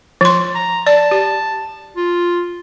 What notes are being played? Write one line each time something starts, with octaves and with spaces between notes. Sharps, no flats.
F3 C6
A#5
D5 A5
G4
F4